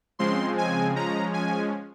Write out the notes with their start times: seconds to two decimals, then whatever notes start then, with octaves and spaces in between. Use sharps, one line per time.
0.19 C#3 F3 G#3 C4 C6
0.58 G#5
0.96 F3 G#3 C#4 A#5
1.34 G#5